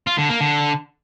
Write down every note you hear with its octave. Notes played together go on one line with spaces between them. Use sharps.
F4
D3
A#3
D3